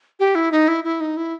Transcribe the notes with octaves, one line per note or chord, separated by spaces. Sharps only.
G4
E4
D#4
E4
E4
D#4
E4